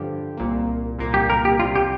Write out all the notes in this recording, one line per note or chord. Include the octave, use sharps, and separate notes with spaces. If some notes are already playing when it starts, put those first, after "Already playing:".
Already playing: G2 D3 F3 D4 G4
C2 A#2 A#3
C2 A#2 A#3
G4
A#4
G4
C2 C3 G3 F4
G4